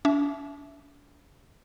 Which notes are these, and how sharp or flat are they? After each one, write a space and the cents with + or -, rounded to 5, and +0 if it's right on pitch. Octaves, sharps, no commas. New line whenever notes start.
D4 -40 E5 +0 D6 -25